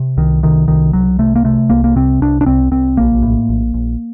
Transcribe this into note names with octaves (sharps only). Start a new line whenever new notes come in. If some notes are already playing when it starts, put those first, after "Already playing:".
Already playing: C3
C2 D#3
C3 D#3
C2 D#3
C2 F#3
C3 A3
A#3
C3 A3
C2 A#3
A#3
C3 C4
C2 D4
D4
C2 C4
C2 C4
A#1 A#3
A2
A#1
A#1